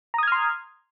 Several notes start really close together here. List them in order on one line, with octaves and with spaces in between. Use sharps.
A#5 D#6 G#6 F6 C6